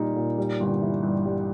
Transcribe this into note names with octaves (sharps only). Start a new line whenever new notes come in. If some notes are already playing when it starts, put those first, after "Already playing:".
Already playing: A#2 G3 A#3 D#4
A#2
G3
G1
E3
G2
G3